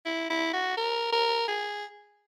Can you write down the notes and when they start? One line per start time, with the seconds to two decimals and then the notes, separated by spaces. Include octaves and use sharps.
0.06 E4
0.30 E4
0.53 F#4
0.77 A#4
1.13 A#4
1.48 G#4